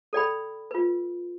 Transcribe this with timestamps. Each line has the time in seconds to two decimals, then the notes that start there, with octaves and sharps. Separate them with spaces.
0.13 A4 D5 G5 B5
0.71 F4 B4